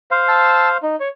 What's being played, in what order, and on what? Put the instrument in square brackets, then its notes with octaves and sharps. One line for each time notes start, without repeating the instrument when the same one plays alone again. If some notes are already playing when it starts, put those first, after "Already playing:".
[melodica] C5 F5
[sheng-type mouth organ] A5 E6
D#4
C#5